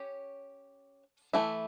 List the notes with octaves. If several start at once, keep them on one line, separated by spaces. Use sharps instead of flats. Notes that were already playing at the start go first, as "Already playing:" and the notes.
Already playing: C#4 G4 C#5
E3 A3 E4